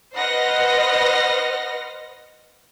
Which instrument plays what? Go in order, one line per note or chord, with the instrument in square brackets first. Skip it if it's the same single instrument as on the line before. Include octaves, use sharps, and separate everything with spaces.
[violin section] B4 C5 D#5 F#5 F6 A#6